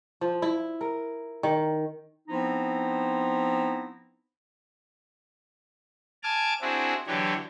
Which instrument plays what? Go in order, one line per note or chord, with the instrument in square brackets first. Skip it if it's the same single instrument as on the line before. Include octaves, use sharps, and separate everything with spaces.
[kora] F3
E4
A#4
D#3
[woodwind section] F3 B3 C4 D#4 E4
[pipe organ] G#5 A5 D6 F6
C4 D4 E4 F#4 G#4
D3 E3 F#3 G4 C#5